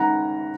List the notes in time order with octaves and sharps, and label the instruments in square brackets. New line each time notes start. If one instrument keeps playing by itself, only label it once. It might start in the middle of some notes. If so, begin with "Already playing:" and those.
Already playing: [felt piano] D#3 G#3 C#4 [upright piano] F#5 A#5